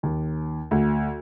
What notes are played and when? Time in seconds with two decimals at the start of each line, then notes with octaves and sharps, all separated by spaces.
0.03 D#2
0.71 D2